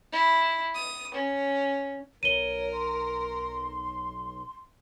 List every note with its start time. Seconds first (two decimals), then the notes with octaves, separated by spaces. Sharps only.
0.12 E4
0.74 D#6
1.14 C#4
2.23 B1 A#4 C#5 D#7 G7
2.72 C6